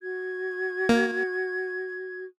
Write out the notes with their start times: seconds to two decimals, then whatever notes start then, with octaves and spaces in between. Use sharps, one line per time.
0.02 F#4 G#6
0.89 A#3